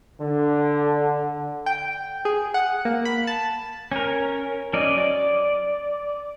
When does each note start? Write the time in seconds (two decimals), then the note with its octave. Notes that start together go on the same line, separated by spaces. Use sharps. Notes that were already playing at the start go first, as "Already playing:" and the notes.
0.20 D3
1.66 G5
2.25 G#4
2.54 F#5
2.85 A#3
3.05 B5
3.27 A5
3.92 C#4 A#4
4.73 F#3 C#4 D5 D#5
4.98 D5